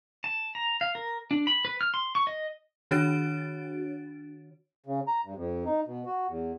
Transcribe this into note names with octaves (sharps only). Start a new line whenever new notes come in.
A5
A#5
F5
A#4
D4
B5
B4
F6
C6
C#6
D#5
D#3 D4 F#4 C#5 A6 D7
C#3
A#5
G2
F2
D#4
B2
F#4
E2